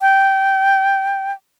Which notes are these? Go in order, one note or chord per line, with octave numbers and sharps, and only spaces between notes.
G5